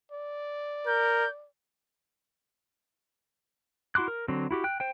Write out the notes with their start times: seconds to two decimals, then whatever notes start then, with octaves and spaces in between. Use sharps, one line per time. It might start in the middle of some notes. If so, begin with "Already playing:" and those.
0.12 D5
0.87 A#4 G6
3.95 E4 F#4 C6 D6 F#6
4.08 A#4
4.28 D3 F#3 C4
4.51 E4 F#4 G4
4.64 G5 F#6
4.80 C5 G5